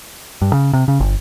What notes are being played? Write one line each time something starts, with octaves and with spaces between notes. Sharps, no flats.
G2
C#3
C3
C#3
G1